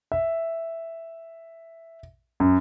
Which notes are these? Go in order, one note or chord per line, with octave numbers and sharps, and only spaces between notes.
E5
F#2